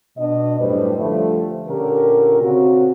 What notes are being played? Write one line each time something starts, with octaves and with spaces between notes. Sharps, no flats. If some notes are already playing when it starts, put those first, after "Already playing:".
B2 D4 D#5
F#2 A2 G3 D4 B4 C5
D3 F3 G3 A3
A#2 D3 C#4 G4 A#4
C#3 C4 F#4